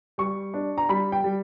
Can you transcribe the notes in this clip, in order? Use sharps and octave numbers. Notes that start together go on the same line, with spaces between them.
G3 C#6
D4
A#5
G3 B5
G5
G3